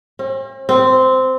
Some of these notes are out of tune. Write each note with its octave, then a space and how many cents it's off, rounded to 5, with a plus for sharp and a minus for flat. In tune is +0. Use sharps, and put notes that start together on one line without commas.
C4 +45
C4 -10